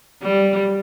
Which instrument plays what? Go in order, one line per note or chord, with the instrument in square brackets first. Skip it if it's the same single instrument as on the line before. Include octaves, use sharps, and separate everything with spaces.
[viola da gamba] G3